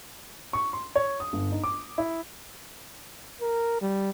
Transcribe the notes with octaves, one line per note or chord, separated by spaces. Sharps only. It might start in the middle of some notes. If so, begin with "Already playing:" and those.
C#6
C6
C#5
D#6
G1
D#4
D6
E4
A#4
G3